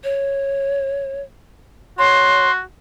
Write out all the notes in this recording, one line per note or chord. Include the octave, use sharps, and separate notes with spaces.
C#5
F#4 C#5 C6